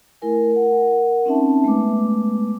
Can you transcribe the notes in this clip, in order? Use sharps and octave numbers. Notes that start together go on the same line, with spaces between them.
A3 E4 A#4 G#5
A#4 F#5
C4 C#4 D#4 E5 A5
G#3 A3 B3 B4 D6